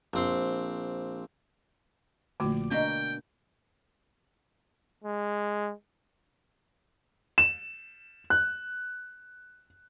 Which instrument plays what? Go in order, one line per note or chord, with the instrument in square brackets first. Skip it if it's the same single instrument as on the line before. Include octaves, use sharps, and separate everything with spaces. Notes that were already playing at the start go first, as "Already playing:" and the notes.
[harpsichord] A#1 C4 C6
[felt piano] A#1 D6 [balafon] D3 A3 F#4
[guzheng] B2 A#3 [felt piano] D4 [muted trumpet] G5
[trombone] G#3
[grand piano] E7
F#6